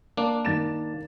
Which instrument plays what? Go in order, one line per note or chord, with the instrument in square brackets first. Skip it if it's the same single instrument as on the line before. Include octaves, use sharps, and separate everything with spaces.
[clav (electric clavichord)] A#3 D4
[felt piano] D#3 A6 E7